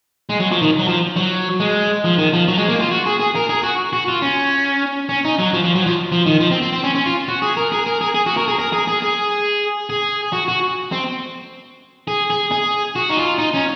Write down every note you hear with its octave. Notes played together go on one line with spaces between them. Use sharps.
G#3
F#3
F3
D#3
F#3
F3
F#3
G#3
F3
D#3
F3
F#3
G#3
A#3
F4
F#4
G#4
G#4
A#4
G#4
F#4
F#4
F4
C#4
C#4
D#4
F#3
F3
F3
F#3
F3
F3
D#3
F3
C4
C4
C4
C#4
C#4
F4
F#4
G#4
A#4
G#4
A#4
G#4
G#4
F#4
A#4
G#4
A#4
G#4
G#4
G#4
G#4
F#4
F#4
C4
G#4
G#4
G#4
F#4
D#4
F4
D#4
C#4